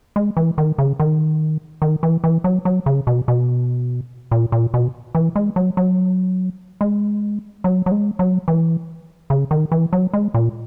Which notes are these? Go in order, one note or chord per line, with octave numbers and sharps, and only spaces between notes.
G#3
E3
D#3
C#3
D#3
D#3
E3
E3
F#3
F#3
C#3
B2
B2
A#2
A#2
B2
E3
G#3
F#3
F#3
G#3
F#3
F#3
G#3
F#3
E3
C#3
D#3
E3
F#3
G#3
A#2